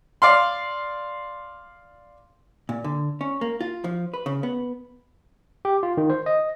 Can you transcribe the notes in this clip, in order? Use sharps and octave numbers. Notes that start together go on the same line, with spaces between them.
D5 F5 C6
A#2
D3
C#4
A#3
F4
F3
B4
C#3
B3
G4
F4
D#3
C5
D#5